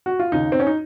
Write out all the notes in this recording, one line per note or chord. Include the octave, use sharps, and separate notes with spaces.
F#4
F4
D#2 C#3 D#4
C4
C#4
D#4